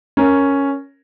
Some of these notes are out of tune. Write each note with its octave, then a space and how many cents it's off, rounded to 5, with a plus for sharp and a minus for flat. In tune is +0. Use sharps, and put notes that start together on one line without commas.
C#4 +0 A#4 +0